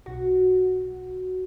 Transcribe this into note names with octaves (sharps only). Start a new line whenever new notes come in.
B1 F#4